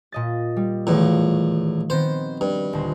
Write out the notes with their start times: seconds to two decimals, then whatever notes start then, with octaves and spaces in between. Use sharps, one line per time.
0.12 A#2 D#5 A6
0.57 G3
0.87 E2 A2 D#3 F3 F#4
1.90 D#3 B3 C4 C5
2.41 G2
2.73 D#1 D2 C5